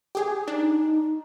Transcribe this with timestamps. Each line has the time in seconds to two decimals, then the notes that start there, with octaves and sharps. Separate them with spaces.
0.15 G4 G#4
0.48 D4 D#4